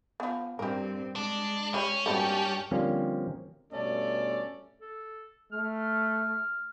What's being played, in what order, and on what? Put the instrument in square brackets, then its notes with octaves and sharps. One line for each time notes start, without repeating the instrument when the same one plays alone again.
[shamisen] F3 B3
[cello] G2 C4 [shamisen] G4 A#4
[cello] G#3 [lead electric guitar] D4
[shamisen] G3 C#5 [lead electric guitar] C#4
[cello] G2 [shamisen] A#3 C4 F#4 [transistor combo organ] G4 G5 A5
[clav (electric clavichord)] D3 F3 G3 A#3 C4 C#4
[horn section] G2 B2 A3 C#4 A4 D5
[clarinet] A4
[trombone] A3 [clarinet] F6